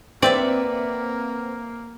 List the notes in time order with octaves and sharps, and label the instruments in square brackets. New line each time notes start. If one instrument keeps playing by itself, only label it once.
[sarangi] A#3 [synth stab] C4 [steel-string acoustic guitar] B4 E5 F#5 [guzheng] D5